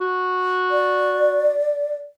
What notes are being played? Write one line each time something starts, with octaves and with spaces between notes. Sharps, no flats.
F#4
D5